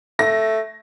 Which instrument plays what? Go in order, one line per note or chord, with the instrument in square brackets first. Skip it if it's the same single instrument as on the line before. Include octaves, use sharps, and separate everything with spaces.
[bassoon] A3 [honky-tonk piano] A#6